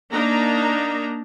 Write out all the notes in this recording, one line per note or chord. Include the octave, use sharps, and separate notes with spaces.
A#3 D4 D#4 A#5